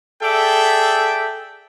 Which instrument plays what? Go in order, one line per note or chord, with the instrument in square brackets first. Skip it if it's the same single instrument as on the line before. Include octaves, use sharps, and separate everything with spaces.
[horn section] G#4 A4 D5 E5 G5